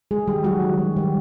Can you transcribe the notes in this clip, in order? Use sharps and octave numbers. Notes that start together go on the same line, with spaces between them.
G#3 G#4
D#3 G3 G4
F#3 G#3 F#4
D#3
G#3
D#3 G3 G4